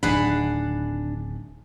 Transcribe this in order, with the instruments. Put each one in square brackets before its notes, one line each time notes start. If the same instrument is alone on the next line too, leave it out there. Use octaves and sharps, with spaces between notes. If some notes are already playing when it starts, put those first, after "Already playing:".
[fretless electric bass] D1 C2 D#3 [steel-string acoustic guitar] D4 [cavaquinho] G#4 F#5 B5